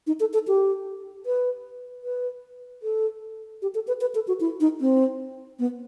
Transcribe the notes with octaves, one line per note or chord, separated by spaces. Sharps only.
D#4
A4
A4
G4
B4
B4
A4
G4
A4
B4
B4
A4
F#4
E4
D#4
C4
B3